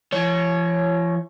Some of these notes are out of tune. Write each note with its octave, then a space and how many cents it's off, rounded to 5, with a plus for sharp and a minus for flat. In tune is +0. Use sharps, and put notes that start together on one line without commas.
F3 -45 C#5 +0